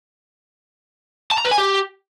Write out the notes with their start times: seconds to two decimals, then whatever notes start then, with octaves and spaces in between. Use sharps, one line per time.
1.32 A5
1.38 A#5
1.45 B4
1.51 G#5
1.58 G4